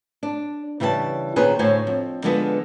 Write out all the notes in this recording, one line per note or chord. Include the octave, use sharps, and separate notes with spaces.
D4
C#3 E3 G3 C5 A5
A#2 D#3 C#4 G#4 B4 C5
D2 A2 C5 C#5 G#5
F2
D3 F3 G#3 B3 B4